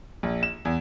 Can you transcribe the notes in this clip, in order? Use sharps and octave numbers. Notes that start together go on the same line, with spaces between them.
A#1
E7
E2